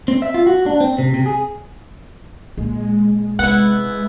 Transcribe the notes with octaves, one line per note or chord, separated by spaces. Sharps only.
C4
E5
F4
F#4
D4
C4
C3
C3
G#4
A#2 G#3
C3 B3 E4 F#5